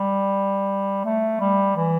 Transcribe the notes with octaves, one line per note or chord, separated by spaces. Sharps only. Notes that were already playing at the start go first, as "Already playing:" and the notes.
Already playing: G3
A3
G3
E3